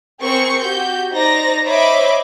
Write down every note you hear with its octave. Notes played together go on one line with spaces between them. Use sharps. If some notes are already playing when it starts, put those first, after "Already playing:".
C4 G#4 A#4 C#6 C#7
F#4 G4 G6
D#4 C5 D5 A#5 A#6
C5 C#5 D#5 E5 B5 D6